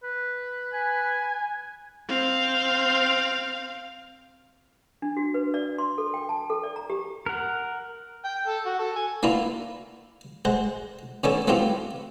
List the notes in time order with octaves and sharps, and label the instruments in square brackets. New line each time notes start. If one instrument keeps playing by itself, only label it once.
[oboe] B4
[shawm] G#5
[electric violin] C4 F5
[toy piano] D4
F#4
B4
D5
C6
A4
G5
A5
A4
D5
A#5
G4
[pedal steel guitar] A#4 F#5
[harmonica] G5
A4
F#4
A4
G#5
[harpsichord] A#3 B3 D4 E4 F4
G#3 C5 F#5
D#3 B3 C#4 D4 A4 C#5
A3 B3 C4 E4 F4 G4